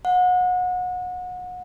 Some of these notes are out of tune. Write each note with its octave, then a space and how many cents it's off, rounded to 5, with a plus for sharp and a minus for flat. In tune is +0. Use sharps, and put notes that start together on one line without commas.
F#5 -30